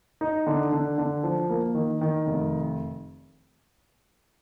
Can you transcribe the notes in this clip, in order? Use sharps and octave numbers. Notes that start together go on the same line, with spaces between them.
D#4
D3
D3
D3
F3
A#3
D#3
D#3
F1